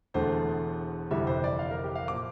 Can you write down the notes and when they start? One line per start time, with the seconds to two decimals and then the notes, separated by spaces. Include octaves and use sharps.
0.14 E1 E2 D3 A3 C5
1.11 G1 F2 C3 E3 G3 E5
1.27 C5
1.44 D5
1.59 F5
1.71 A#4
1.84 G4
1.95 F5
2.08 A#2 F3 A#3 D6